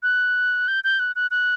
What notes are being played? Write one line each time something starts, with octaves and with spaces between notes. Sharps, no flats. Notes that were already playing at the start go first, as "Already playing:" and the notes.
F#6
G6
G6
F#6
F#6
F#6